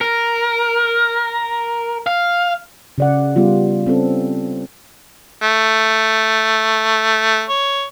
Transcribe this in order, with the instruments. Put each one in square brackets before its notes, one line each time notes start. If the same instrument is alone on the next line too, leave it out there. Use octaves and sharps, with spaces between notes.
[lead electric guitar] A#4
F5
[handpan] C#3 D5 F#5
G3 B3 F4
C4 C#4 A4
[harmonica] A3
C#5